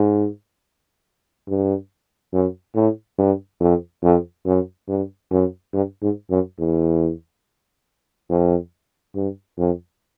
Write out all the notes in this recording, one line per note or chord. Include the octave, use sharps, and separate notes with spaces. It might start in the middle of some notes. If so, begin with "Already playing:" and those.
Already playing: G#2
G2
F#2
A2
G2
F2
F2
F#2
G2
F#2
G2
G#2
F#2
E2
F2
G2
F2